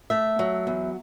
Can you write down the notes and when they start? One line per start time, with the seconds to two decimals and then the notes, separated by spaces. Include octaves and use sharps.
0.10 A3 E5
0.39 F#3
0.67 E2